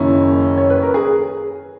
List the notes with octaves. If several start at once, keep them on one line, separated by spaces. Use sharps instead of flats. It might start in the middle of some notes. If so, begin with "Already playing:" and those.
Already playing: F#1 F#2 D#3 A#3 C#4 E4
C#5
B4
A#4
G#4